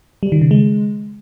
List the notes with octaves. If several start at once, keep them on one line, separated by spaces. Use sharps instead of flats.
G3
D#3
C#3
G#3